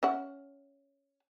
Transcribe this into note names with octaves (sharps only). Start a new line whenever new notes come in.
C#4 E5 F#5